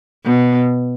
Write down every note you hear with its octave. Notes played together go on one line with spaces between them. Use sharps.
B2